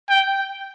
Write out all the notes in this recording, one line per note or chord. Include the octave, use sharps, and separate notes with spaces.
G5